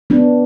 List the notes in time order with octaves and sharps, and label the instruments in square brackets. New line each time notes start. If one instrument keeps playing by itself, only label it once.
[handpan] B3 D4